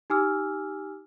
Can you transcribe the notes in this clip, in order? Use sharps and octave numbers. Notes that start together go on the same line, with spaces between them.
D#4 G4 G#5 D6 E6 F6